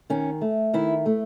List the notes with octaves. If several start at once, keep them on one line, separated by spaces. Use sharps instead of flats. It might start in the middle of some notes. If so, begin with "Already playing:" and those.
D#3 C#4
A3
D#3 E4
A3